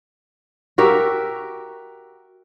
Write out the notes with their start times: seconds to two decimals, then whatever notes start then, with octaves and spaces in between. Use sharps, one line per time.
0.78 F#4 G4 A#4 E5